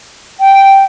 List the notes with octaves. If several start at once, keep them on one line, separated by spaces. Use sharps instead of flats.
G5